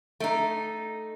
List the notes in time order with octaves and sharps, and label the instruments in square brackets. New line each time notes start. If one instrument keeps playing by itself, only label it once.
[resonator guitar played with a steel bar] A3 D#4